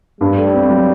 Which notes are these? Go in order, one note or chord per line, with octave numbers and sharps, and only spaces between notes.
G2 G3
A3
C4
F#3